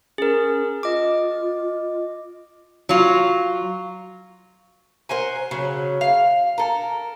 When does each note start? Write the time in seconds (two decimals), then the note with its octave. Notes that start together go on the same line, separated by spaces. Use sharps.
0.18 C#4 G#4 A#4
0.83 F4 D#5 D6
2.89 F#3 F4
5.09 A#4 C5 F#5 G#5
5.51 C#3 F#3
6.01 F5
6.58 A4 A#4